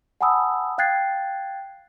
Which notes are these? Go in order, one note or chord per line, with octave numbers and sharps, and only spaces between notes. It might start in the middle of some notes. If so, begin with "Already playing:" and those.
F#5 G#5 A5 B5 D#6 E6
F5 G5 F#6 G#6 A6 C7